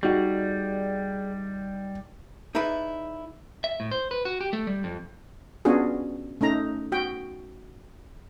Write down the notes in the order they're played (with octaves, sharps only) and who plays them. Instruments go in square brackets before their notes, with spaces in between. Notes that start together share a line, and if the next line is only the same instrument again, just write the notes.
[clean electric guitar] G3 [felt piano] D#4 F#5 [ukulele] F#4 D#5 [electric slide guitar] G#4 D5
[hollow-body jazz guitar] D#4 E4 G#4 B4 D5
[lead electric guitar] E5
A2
C5
B4
F#4
G4
A3
G3
F2
[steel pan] B3 C#4 D4 F4 F#4 G#4
A3 C#4 D#4 A#5
F#4 G5